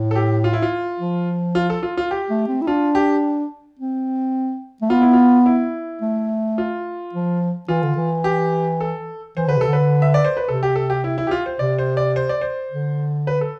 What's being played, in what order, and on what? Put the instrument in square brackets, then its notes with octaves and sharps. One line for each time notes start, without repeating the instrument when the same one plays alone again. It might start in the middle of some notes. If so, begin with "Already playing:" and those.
Already playing: [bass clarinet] A2
[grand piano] A4
G4
F4
E4
F4
[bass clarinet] F3
[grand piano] F4
A4
F4
F4
G4
[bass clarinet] A3
C4
E4
[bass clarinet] D4 [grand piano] F4
[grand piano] G4
[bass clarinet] C4
A3
[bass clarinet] B3 [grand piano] F4
[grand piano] E4
F4
E4
[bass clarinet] A3
[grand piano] F4
[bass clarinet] F3
[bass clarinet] E3 [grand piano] F4
[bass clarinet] D3
E3
[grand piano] G4
A4
[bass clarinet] E3 [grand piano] C5
[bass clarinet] D3 [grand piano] B4
[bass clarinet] C3 [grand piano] A4
[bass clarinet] D3
[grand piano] B4
E5
D5
C5
B4
[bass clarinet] C3 [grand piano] A4
[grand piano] G4
A4
G4
E4
E4
G4
F4
C5
[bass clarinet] C3 [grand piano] D5
[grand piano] C5
D5
C5
D5
C5
[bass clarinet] D3
[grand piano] B4
A4